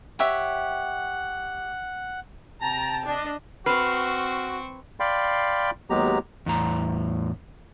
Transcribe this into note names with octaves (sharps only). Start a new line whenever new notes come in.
G4 C#5 E5 F#5
C3 G5 A5 A#5
D4 D#5
C4 F#4 B4 C#6 F6 C7
D5 F5 G5 B5 C6
D#2 F#3 G#3 B3 G4 A#5
E2 A2 A#5